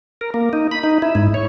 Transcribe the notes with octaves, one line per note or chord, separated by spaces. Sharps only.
A#4
A#3
D#4
B5
D#4
E4
G#2
C#5